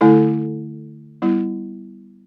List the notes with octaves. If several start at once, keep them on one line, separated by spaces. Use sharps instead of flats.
D3 A3 E4 A4
G3 B3 E4